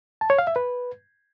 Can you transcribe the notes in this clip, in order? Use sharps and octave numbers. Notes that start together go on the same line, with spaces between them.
A5
C#5
F5
E5
B4